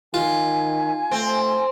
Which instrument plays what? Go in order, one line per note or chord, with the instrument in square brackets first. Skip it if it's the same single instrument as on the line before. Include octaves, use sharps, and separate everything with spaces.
[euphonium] D#3 [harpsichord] F4 [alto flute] G#5
[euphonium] A3 [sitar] C4